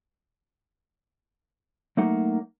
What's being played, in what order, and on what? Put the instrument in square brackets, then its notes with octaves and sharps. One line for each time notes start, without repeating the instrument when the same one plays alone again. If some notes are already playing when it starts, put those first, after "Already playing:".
[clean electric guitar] F#3 A3 A#3 D#4 F#5